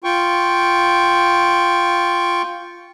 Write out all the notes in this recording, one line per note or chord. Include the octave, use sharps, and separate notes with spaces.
F4 G5 C#6